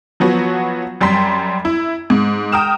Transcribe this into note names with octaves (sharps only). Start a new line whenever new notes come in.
F3 F#3 B3 F#4
F#2 G3 G5 A#5 C6 B6
E4
G#2
G5 A#5 D#6 F6 E7